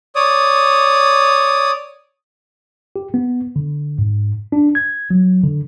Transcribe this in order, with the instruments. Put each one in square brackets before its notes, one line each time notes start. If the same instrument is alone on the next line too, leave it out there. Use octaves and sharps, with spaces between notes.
[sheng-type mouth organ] C#5 D5 D#6
[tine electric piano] G4
B3
D3
G#2
D4
G#6
F#3
D3